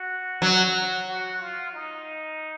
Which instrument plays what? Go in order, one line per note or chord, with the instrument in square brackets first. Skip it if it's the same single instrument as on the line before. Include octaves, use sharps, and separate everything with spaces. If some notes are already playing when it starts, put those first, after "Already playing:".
Already playing: [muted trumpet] F#4
[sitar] F#3
[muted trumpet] F#4
F4
D#4